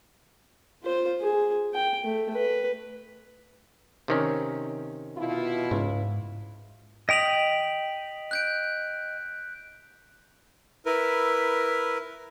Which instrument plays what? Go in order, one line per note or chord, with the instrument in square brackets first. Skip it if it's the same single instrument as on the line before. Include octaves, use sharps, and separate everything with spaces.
[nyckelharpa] F4 C5
G#4
G5
A3
B4
[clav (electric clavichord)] C3 D#3 C#4
[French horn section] B2 E4 F4
[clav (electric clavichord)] C#2 [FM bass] G#2
[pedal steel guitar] D#5 G5 D#6 [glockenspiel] B6 F7 F#7
[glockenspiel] F#6 G6 D7
[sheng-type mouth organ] E4 A#4 B4